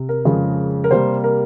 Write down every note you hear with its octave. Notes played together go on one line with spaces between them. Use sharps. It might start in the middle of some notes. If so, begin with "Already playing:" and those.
Already playing: C3
A#4
F2 C#3 G#3
A#4
C3 G3 A#3 C5
A#4